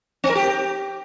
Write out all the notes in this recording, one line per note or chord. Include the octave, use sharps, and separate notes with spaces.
C4
A#4
G4